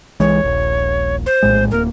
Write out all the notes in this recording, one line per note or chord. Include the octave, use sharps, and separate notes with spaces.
C2 E3 G#3 C#5
D#1 A#1
C5
A#1 A2 G#3
D1 A#3 A#4